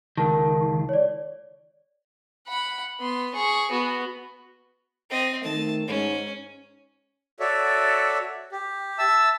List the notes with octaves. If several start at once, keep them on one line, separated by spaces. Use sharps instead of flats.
C#2 D#3 A#4 A5
C#5 D5
F#5 B5
B3 C6
G#4 C#6
B3 F#4
C4 D#5
D#3 A3 A5
G#2 C#4
F#4 A4 C#5 D5 E5
G4
E5 A5 E6